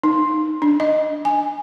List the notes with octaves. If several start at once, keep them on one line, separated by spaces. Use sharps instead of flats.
D#4
D4
D#5
G#5